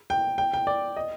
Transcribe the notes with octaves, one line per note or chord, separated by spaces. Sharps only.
G5
G5
G5
D5
D#5